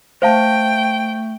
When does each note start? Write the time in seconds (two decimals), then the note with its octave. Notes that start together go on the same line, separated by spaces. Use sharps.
0.22 A3 C5 F5 G5 A5